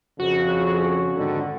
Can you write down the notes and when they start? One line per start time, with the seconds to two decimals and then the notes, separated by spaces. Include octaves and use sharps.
0.20 F2 C#3 F#4
1.17 G#2 D3 D#3